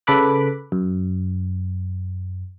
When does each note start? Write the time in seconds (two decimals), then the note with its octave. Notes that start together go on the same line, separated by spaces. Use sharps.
0.07 C#3 A4 B4 B5 D6 F#6
0.72 F#2